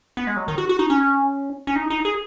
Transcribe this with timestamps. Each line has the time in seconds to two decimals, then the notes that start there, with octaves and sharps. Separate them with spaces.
0.17 B3
0.27 G#3
0.37 F#3
0.48 D#3
0.58 F#4
0.69 F#4
0.79 D#4
0.90 C#4
1.67 C#4
1.76 D#4
1.90 D#4
2.05 G#4